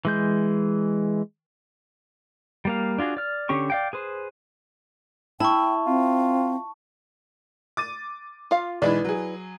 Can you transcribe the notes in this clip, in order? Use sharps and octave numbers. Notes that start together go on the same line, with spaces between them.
E3 G#3 G6
G3 A#3 F5
D4 F4 F#4 G#4
D5 F6
D3 C#4 G4 C#6
D5 F5 G5
G#4 B4 C5
E4 G5 A5 C#6
C4 F4
D6 A6 D#7
F4 F5
B1 E3 G#3 E4 B4 D5
F#3 G#4